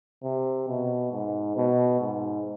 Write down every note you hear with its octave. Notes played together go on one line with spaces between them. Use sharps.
C3
B2
G#2
B2
G#2